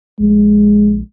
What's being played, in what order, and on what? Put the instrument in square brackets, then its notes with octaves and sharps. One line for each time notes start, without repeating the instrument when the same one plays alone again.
[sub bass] A#1 [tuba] G#3